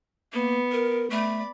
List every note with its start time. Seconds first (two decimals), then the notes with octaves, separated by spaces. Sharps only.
0.33 A#3 B3
0.72 A#4
1.10 A3 D5 B5